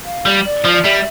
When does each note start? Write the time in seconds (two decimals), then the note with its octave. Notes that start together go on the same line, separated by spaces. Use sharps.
0.05 F5
0.26 G3
0.45 D5
0.64 F3
0.73 D5
0.84 G3 E5